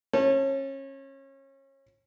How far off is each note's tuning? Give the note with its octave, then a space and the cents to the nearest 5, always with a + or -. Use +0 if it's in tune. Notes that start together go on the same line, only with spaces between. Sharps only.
C#4 -30 A5 +0